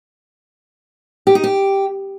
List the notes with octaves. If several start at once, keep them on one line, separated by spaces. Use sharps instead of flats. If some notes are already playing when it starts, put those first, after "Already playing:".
G4
D#4
G4